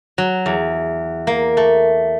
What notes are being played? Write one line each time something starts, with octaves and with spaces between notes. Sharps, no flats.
F#3
E2
A#3
A3